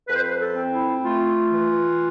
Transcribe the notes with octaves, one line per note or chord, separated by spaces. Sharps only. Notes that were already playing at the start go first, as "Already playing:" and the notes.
F2 B4
C5
B4
A4
C4
E4
A3 F4
E3